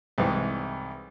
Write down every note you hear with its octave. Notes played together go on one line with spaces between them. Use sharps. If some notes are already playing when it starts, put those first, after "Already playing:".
C2 G#2 E3